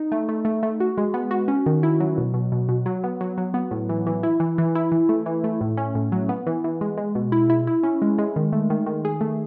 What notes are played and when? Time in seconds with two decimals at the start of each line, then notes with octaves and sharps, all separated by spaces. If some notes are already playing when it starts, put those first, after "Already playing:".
Already playing: D#4
0.12 A3
0.29 A3
0.45 A3
0.63 A3
0.80 F#4
0.98 G#3
1.14 B3
1.31 F#4
1.48 C#4
1.66 D#3
1.83 E4
2.00 F#3
2.18 B2
2.34 B2
2.52 B2
2.69 B2
2.86 F#3
3.04 B3
3.21 F#3
3.38 F#3
3.54 B3
3.71 A2
3.89 E3
4.07 E3
4.23 E4
4.40 E3
4.58 E3
4.75 E4
4.92 E3
5.09 A3
5.26 E3
5.44 A3
5.61 A2
5.77 C#4
5.95 A2
6.12 F#3
6.29 B3
6.47 E3
6.64 E3
6.81 G#3
6.98 G#3
7.15 B2
7.32 E4
7.50 E4
7.67 E4
7.83 C#4
8.02 G#3
8.18 G#3
8.36 D#3
8.52 A3
8.70 D#3
8.86 D#3
9.05 G#4
9.21 A3